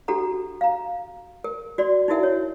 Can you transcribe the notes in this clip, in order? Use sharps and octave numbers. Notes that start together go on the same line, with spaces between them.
D4 F#4 G4 A4 F#5 A#5
F5 A#5
A#4
F#4 D5 C6
D#4 E4 F#4 A#4 E5 F#5
C#5